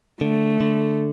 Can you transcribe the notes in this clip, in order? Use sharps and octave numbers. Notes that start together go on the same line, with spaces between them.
D3 A3
D3